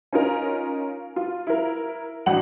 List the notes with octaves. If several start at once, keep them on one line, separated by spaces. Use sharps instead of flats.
C#4 D#4 F4 A#4
F4
E4 A#4
A1 D4 F#4 F#5 F#7